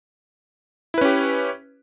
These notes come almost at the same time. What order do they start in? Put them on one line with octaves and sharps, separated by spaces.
E4 B4 C#4 G4